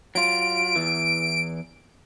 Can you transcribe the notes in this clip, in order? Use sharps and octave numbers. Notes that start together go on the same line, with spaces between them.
F#3 F4 D7
E2 E3